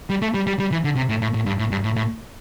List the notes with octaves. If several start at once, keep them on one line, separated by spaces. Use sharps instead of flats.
G3
A3
G3
G3
G3
E3
D3
C3
A2
A2
A2
G2
A2
G2
A2
A2